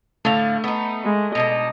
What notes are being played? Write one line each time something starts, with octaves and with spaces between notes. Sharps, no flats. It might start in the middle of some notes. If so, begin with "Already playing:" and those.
A2 D3 A3 F5
B3 D#4
G#3
B2 D4 D#4 D#5